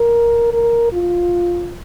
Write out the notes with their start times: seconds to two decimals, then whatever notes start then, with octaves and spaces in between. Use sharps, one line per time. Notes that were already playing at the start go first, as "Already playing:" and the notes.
Already playing: A#4
0.53 A#4
0.93 F4